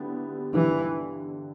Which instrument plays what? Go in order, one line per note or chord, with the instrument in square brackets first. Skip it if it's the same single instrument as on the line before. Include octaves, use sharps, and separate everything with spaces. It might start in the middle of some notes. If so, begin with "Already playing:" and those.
Already playing: [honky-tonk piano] D3 B3 E4 G4
[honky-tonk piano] G2 D3 G3 [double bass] E3